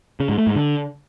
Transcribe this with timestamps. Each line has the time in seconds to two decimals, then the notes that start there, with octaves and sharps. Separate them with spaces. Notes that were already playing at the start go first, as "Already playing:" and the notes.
0.20 C#3
0.29 G#2
0.38 A3
0.47 G#2
0.56 D3